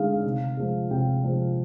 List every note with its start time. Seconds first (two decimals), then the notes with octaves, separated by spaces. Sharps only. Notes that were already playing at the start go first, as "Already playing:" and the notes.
Already playing: D3 G#3 D#4 F5
0.24 C3
0.57 F3 G#3
0.91 C3 G5
1.24 F3 G#3